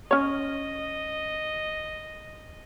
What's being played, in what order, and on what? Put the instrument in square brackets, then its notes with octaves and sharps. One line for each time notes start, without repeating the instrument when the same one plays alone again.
[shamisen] C#4 C#5 [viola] D#5